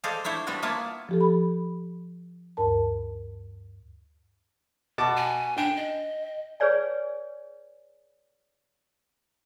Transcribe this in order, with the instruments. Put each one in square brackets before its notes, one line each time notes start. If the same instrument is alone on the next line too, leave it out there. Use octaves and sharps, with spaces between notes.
[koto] G#4 A4 C5 D5 D#5 F5
D4 E4 C5 C#5
G3 B3 C4 D4 F#4
A#3 B3 E4 F4 C#5 A5
[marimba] F3 G4 A4
B5
D2 G2 A#4 A5
[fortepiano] B2 A5 D6
[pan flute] G#5
[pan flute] D4 [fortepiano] G5
[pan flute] D#5
[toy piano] G#4 B4 C#5 D5 G#5